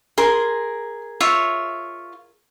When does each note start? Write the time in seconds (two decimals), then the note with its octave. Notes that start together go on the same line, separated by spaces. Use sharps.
0.18 G#4 A#4 C6
1.20 F4 C#5 E5